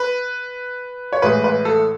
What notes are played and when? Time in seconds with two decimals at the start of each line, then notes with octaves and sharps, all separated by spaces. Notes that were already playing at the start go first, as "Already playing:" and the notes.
Already playing: B4
1.13 C#5
1.22 A1 A2 E3 G#3 B4
1.44 B4
1.65 A4